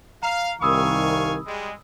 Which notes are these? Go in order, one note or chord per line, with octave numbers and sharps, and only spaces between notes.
F5 A#5
C2 D#3 F5 G#5 B5 C#6 D#6 E6
G3 G#3